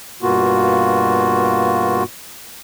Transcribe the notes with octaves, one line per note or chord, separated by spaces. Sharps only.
G2 B2 A#3 F4 F#4